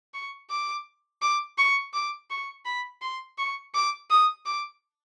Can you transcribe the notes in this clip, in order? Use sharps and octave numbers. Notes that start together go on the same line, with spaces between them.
C#6
D6
D6
C#6
D6
C#6
B5
C6
C#6
D6
D#6
D6